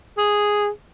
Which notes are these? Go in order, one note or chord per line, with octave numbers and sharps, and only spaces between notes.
G#4